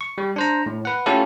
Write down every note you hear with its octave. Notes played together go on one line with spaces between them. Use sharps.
C#6
G3
D4 C5 A#5
A2
B4 F#5
A3 C#4 E4 F4 G4 A4